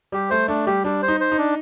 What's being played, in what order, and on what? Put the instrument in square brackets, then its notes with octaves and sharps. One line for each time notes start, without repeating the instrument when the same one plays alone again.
[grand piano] G3 [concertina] G4
[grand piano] A3 [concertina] C5
[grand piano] A3 [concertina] D4
[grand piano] G3 [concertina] G4
[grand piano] G3 [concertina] D4
[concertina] C5
[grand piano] D#4
[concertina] C5
[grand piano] D#4
[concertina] D4